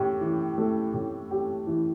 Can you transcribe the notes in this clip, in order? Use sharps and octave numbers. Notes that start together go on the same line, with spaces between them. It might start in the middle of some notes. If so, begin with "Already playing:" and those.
Already playing: A2 G4
E3
A3
A2
G4
E3